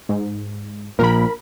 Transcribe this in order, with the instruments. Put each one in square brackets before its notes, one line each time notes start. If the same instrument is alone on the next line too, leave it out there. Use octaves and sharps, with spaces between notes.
[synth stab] G#2
[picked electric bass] A#1 A#2 [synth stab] A#4 B5